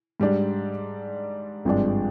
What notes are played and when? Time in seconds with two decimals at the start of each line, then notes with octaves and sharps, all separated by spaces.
0.20 G#2 G3 D4
1.65 G#1 G2 F3 G#3 D4